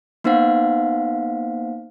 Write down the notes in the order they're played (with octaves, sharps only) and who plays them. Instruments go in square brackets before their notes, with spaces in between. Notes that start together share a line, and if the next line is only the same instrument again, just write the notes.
[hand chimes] A#3 B3 D#4 C5 F5 F#5